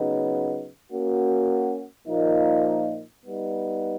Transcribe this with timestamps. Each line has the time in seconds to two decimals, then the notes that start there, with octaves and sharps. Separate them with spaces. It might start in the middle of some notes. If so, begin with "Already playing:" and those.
Already playing: C#3 F#3 B3 D#4
0.91 A#3 C#4 F#4
2.08 A#2 F3 A#3 D#4
3.24 G3 B3 D#4